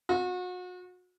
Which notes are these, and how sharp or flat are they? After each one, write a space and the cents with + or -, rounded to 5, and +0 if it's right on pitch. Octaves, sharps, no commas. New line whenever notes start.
F#4 -35